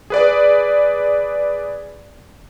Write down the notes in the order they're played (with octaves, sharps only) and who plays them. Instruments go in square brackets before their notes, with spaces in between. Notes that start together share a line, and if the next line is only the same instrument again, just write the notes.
[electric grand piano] G#4 B4 D5